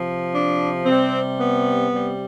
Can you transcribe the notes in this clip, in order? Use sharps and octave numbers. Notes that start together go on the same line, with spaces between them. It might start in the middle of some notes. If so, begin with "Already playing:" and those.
Already playing: C3 F3
D4
C3 G3 C4
B3
C3 G3